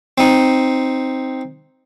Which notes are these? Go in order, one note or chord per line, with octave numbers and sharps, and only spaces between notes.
C4 D#4